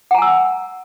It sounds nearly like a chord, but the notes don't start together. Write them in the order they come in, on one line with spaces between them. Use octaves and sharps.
F#5 A#5 G#5 E6